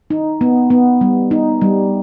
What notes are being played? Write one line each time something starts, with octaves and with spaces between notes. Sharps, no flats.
D#4
B3
B3
G3
D#4
G3